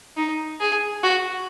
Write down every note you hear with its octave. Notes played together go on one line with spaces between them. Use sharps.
D#4
G#4
F#4